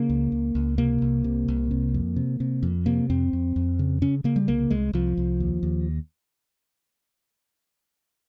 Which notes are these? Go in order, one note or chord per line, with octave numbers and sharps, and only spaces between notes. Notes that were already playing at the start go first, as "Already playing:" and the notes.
Already playing: C#3 A#3
C#2
C#2
C#2
C3 A#3
C2
C3
C2
C3
F2
C3
C3
F2
C3 A#3
F2 C4
F2
F2
C#3
C#3 C#4
C#3 A#3
G3
C2 A#3
C2 G#3
C2 F3
C2
D#2
D#2